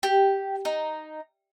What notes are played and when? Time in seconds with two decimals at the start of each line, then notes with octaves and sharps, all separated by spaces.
0.03 G4
0.65 D#4